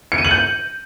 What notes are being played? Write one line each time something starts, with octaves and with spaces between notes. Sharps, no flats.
C#7
D#7
F#7
G6